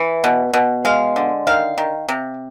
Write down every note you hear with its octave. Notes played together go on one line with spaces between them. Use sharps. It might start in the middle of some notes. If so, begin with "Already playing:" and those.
Already playing: E3 E5
B2
B2
G#3 F5
D3
D#3 F5
D#3
C3